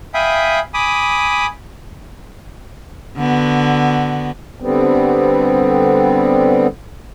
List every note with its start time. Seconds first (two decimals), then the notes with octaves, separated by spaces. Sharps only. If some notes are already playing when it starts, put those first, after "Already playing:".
0.14 E5 F5 G5 G#5 B5 D#6
0.74 G#5 B5 D6 D#6
3.17 D3 B3 F#4
4.60 D3 G3 B3 C4